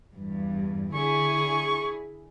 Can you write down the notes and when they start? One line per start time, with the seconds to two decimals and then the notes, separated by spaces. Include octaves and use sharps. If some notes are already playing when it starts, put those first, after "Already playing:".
0.14 E2 G2
0.94 D3 E4 G#4 C#6